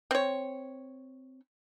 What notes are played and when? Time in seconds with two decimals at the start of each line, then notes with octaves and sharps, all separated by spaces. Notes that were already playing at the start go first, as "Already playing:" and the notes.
0.11 C4 C#5